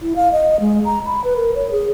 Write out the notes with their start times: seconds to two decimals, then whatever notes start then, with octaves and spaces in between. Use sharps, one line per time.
0.01 E4
0.16 F5
0.32 D#5
0.60 G#3
0.85 A#5
1.06 B5
1.24 B4
1.36 A#4
1.55 C#5
1.71 G#4